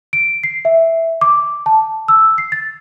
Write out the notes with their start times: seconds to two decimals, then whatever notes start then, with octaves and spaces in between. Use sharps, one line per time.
0.13 D7
0.43 C7
0.65 E5
1.21 D6
1.66 A5
2.08 E6
2.38 C7
2.52 A6